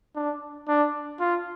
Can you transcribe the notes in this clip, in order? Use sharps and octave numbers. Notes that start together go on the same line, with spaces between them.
D4
D4
F4